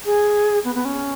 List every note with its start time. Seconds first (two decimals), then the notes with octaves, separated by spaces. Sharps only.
0.06 G#4
0.64 B3
0.75 B3
0.85 C#4